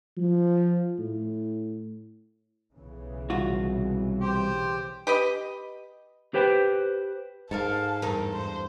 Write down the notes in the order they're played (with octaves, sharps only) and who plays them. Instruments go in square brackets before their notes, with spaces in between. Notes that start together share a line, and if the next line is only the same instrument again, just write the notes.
[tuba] F3
A2
[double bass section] B1 C#3 E3
[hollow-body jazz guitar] C2 F4 F#4
[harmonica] G4 C5
[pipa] G4 B4 D#5
[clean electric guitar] G4 B4 C5 G5
[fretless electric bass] G#2 [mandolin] A4 A#4 F5 [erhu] A5
[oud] E2 G2 A#4 [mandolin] D#4 A4
[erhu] C5